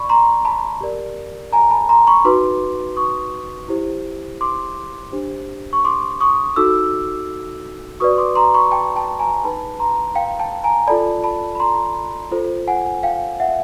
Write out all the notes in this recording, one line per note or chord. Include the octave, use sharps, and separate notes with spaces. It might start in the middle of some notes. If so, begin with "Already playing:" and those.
Already playing: D5 B5 C#6
A#5 C6
A5 B5
G4 A#4 D5
G#5 A#5
A5 B5
A#5 C6
B5 C#6
D#4 F#4 B4 C6 D6
C#6 D#6
E4 G4 C5
C6 D6
D4 G4 C5
C#6
C6 D6
C#6 D#6
D#4 F#4 A4 D6 E6
F#4 B4 D5 C#6 D#6
C6 D6
A#5 C6
B5 C#6
G5 A5
G5 A5
G#5 A#5
D#4 G#4 B4 A5 B5
A#5 C6
F5 G5
G5 A5
G#5 A#5
F4 A4 D5 A5 B5
A5 B5
B5
A#5 C6
F4 A4 C5
F#5 G#5
F5 G5
E5 F#5